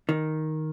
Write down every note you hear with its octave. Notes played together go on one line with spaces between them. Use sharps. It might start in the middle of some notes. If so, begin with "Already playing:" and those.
D#3